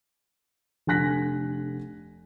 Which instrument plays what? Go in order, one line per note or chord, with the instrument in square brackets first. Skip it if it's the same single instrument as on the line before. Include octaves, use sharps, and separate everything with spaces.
[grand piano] F1 D3 G#5 F#6 A#6 B6